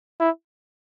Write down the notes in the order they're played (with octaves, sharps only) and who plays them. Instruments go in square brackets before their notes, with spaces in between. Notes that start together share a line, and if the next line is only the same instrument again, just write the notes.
[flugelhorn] E4